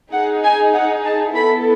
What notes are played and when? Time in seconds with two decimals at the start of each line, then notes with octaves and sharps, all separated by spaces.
0.12 D#4 G#4 F#5
0.44 G#5
0.73 F#5
1.05 A5
1.34 B3 E4 A4 B5